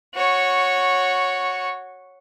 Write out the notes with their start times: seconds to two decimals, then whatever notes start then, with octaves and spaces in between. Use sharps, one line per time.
0.15 F#4 C#5